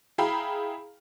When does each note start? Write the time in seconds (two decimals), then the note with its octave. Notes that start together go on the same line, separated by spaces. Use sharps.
0.18 E4 G#4 F5 G5 A#5 B5